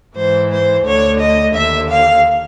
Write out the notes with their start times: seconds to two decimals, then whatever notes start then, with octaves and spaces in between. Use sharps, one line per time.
0.16 G#2 E3 C5
0.50 C5
0.84 D2 D3 C#5
1.19 D#5
1.53 D#2 D3 E5
1.88 F5